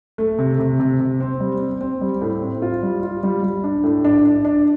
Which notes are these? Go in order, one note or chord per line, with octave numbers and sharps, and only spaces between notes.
A3
C3
C3
C3
C3
C4
G3
C4
C4
G3
A2
C4
F4
G3
F4
G3
G3
D4
A2
D4
D4
D4